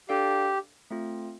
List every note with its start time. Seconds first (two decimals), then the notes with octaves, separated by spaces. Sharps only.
0.09 D4 G4 A4 D5 F5
0.91 A3 C4 F4